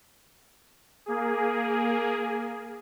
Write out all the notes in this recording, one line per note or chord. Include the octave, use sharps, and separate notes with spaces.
A#3 G#4